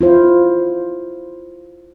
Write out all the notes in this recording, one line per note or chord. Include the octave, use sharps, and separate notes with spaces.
E4 F4 C5